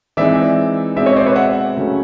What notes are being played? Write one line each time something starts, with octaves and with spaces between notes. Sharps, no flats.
E3 G#3 C4 D#4 D5 E5
B2 G#3 C4 D5 E5
C#5 D#5
C5 D5
B4 C#5
E5 F#5
C#3 F#3 A3 C#4